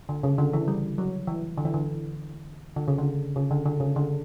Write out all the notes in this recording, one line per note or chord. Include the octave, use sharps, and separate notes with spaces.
D3
C#3
D3
E3
G3
F#3
E3
D3
E3
D3
D3
C#3
D3
C#3
D3
D3
C#3
D3